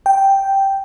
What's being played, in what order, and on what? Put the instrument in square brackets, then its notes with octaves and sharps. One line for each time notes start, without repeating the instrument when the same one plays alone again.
[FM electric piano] G5